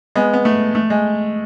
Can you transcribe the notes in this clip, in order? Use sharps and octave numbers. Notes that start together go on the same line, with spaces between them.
G#3 B3
B3
A3
A3
G#3